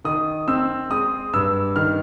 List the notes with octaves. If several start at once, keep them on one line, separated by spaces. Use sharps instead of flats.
D#3 D#6
C4 E6
G#3 D#6
G2 E6
D#3 F6